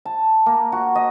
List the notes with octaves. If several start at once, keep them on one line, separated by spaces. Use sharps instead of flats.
A5
A#3
F#4
D#5